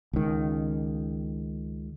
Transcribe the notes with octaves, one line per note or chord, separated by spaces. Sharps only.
C#2 D#3